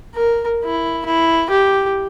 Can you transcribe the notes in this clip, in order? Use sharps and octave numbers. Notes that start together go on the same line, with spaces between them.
A#4
E4
E4
G4